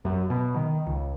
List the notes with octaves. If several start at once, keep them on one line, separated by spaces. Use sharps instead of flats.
F#2
B2
D#3
C#2